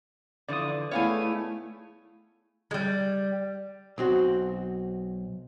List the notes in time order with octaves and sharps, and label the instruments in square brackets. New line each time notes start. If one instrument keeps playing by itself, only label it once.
[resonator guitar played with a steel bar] D3 E3 F3 [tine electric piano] D5 D#6
[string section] G#3 A3 [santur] B3 E4 [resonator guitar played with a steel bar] C#5 F5 G#5
[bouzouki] G3 G#3
[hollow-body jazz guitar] B1 C4 F#4